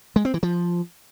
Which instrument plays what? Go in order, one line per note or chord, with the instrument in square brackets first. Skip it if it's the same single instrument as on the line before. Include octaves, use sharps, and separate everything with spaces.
[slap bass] G#3
C4
E3
F3